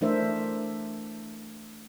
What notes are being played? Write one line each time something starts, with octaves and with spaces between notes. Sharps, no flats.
E3 A3 D4 A#4 C5 E5